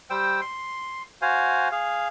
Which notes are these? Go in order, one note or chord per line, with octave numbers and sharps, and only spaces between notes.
G3 C5 G5 E6
C6
F#4 C5 F5 G#5
G#4 F5